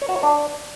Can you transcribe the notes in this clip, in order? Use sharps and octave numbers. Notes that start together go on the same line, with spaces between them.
C#5
F#4
C#5
D4